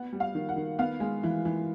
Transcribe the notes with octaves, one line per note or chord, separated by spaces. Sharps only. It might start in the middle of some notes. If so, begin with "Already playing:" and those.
Already playing: B3 F#5
G3
F5
D#3
F#5
D#3
B3 F5
G#3
E3
E3